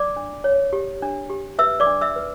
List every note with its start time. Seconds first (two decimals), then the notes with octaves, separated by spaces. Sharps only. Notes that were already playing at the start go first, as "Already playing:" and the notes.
Already playing: D5 D6
0.16 D4
0.44 C#5
0.73 G4
1.02 D4
1.30 G4
1.59 B4 E5 E6
1.80 D5 D6
1.87 D4
2.01 E5 E6
2.16 B4